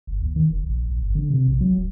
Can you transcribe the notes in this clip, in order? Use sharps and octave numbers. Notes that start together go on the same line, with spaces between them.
G1
D#2
D#3
F1
A#1
A#1
G1
D3
C3
A#1
F#3
D1